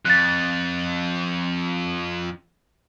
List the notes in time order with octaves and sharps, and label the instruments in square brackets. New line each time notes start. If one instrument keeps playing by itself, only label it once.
[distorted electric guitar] F2 [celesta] F#6 A6